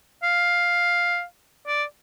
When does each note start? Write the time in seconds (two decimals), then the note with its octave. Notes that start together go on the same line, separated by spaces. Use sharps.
0.23 F5
1.67 D5